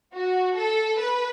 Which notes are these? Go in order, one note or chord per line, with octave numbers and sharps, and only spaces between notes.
F#4
A4
B4